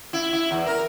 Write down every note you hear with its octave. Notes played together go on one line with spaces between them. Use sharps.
E4
E4
E2
A#4